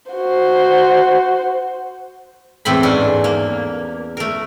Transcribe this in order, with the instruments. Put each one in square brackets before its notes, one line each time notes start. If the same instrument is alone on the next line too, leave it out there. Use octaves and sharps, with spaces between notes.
[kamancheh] F#4 C5
[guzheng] E2 A2 C4 B5
G#2 C#4 D4
A#3
A3 A#4